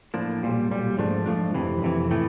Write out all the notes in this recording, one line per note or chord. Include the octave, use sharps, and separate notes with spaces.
A2 F3 A#3 D4
B1 A#2 G3
B1 A#2 G3
G#2 F3 A3 D4
G#2 F3 A3 D4
F2 C3 E3
F2 C3 E3
A2 E3 A3